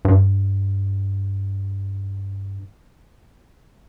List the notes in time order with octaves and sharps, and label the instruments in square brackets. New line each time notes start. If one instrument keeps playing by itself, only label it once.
[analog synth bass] G2